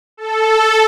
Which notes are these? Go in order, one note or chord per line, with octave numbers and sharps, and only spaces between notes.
A4